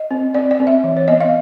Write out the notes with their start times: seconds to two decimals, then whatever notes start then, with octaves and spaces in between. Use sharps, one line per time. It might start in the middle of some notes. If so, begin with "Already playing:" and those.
Already playing: D#5
0.11 C4
0.34 C4 D5
0.51 D5
0.60 C4
0.67 E5
0.84 E3
0.97 C#5
1.08 B3 D#5
1.20 F5